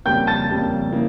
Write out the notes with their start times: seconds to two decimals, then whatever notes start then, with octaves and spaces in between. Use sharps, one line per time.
0.05 F2 C#3 G3 A#3 G5 G6
0.27 A5 A6
0.49 F2 C#3 G3 A#3
0.92 C#3 E3 A#3